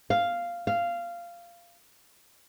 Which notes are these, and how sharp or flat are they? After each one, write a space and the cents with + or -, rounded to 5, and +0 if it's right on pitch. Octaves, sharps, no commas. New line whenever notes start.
F5 -5
F5 -15